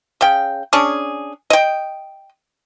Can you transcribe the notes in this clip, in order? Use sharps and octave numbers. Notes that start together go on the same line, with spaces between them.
C#3 G5
C#4 D4 G#4
D#5 G5